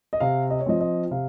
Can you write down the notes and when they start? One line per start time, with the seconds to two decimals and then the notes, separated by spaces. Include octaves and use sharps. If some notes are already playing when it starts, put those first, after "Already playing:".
0.13 D#5
0.20 C3 F5
0.51 D#5
0.60 C#5
0.66 F3 C4 D#5
0.81 D#5
1.11 C3 F5